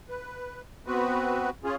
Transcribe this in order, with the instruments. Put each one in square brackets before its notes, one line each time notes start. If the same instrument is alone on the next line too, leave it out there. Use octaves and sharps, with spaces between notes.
[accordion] B4
B3 C4 F#4 B4
C#4 F4 G#4